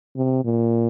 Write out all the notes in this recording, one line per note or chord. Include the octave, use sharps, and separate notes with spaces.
C3
A#2